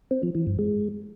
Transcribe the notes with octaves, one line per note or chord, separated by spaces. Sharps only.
C4
F3
E3
G2
G#3